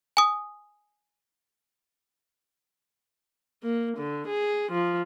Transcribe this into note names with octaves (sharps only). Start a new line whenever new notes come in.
G#5 D#6
A#3
D3
G#4
F3